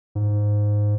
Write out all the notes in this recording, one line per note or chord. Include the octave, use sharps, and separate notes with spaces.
G#2